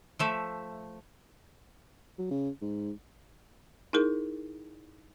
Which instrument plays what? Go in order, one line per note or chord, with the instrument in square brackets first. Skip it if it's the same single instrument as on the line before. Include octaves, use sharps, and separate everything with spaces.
[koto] F3 A3 E5
[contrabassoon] F#3
C#3
G#2
[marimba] D#4 E4 G#4 A#4